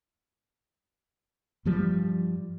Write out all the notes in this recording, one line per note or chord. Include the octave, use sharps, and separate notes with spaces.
G2 F3 G3